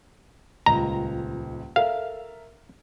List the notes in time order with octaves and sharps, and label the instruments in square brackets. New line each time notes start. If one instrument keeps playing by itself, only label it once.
[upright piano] D#1 C#2 [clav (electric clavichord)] A#5
[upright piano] A4 A#4 E5 [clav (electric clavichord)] F5